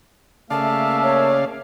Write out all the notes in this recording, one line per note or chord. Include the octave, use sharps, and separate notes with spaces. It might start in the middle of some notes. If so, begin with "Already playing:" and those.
C#3 A3 A#3 D5 E5 F5 A5
C#5